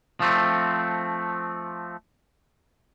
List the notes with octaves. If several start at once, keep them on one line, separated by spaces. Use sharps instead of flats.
F3 A3 C4